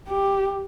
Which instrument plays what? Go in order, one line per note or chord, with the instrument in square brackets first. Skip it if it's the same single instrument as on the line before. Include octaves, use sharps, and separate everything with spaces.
[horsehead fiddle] G4